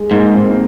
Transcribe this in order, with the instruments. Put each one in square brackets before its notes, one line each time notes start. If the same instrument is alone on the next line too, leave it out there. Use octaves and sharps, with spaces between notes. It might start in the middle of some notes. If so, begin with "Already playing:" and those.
Already playing: [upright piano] G#3
[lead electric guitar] G#2 [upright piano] A#3
[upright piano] C4
A#3